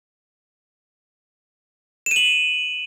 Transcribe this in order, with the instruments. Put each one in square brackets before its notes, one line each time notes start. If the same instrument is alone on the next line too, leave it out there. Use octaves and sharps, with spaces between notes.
[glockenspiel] E7
D#7
F#7